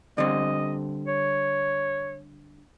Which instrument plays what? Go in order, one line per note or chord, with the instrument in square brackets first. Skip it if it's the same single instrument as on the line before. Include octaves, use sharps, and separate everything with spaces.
[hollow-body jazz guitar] D3 G3 C4 [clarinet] D#5
[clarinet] C#5